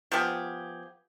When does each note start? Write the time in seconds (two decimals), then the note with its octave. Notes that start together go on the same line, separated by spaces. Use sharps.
0.12 F3 B3 G4 G#4